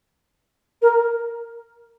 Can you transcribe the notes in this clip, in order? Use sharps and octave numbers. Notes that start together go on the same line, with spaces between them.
A#4